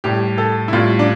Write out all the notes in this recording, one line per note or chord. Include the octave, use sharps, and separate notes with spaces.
A2 G3 G4
A4
E4
A2 G3 F4
D4